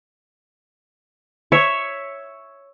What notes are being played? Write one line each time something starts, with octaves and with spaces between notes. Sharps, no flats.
C#5 E5